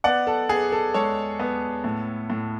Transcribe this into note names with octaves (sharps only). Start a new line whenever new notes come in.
B3 D5 F#5
A4
B3 G#4
A4
G#3 A4 C#5
B3
A2
A2